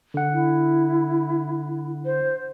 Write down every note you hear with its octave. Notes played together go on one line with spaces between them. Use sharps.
D3 F#5
E4
C5